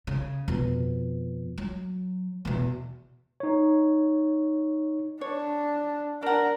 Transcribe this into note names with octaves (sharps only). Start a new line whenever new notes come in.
C#3
F2 B2
F#3
E2 B2
D#4 C#5
D4 C#5
D4 A#4 F#5